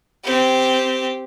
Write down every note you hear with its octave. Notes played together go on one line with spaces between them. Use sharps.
C4 G4